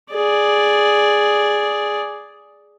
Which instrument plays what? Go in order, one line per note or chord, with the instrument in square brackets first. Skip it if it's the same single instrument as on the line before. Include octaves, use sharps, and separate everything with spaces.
[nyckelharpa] G#4 D5